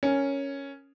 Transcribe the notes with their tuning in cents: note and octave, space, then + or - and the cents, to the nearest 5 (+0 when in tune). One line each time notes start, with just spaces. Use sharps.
C#4 +0 A#4 +0